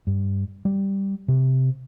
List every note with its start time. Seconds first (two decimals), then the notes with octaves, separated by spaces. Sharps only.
0.07 G2
0.65 G3
1.28 C3